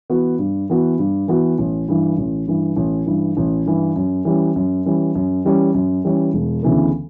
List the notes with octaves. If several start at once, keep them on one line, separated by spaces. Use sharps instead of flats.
E3 B3 F#4
G2
E3 B3 F#4
G2
E3 B3 F#4
A1
G2 E3
A1
G2 E3
A1
G2 E3
A1
G2 E3
F#2
E3 G3 C#4
F#2
E3 G3 C#4
F#2
E3 G3 C#4
F#2
E3 G3 C#4
E1
D2 C#3 E3 B3